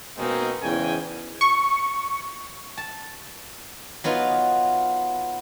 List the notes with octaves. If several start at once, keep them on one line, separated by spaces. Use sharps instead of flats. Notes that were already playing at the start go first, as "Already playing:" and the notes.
B2 G#3 A#3 C4 C#4 D#4
E2 G#2 C#3 G5 G#5
C#6
A5
F#3 B3 D#4 F4